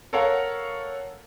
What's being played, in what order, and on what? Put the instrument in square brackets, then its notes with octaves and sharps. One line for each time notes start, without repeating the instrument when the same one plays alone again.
[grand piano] A4 A#4 C#5 F5 F#5